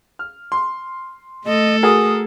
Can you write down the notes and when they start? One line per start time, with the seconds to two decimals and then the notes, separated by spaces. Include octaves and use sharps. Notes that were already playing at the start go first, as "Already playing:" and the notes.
0.19 F6
0.52 C6
1.46 A3 A4 D#5
1.83 F#4 G#4 A#4 D#6